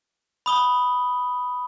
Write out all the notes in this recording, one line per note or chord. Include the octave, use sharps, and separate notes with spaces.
B5 D#6 G7